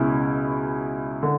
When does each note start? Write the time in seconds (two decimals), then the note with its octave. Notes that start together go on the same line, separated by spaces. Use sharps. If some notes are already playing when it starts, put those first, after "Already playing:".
Already playing: C#2 B2 C#4 E4
1.23 D3